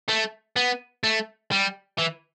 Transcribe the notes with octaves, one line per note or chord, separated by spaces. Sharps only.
A3
B3
A3
G3
E3